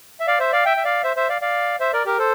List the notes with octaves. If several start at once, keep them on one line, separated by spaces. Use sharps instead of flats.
E5
D5 F5
C5 E5
D5 F5
E5 G5
E5
D5 F5
C5 E5
C5 E5
D5 F5
D5 F5
C5 E5
A#4 D5
G4 A#4
A4 C5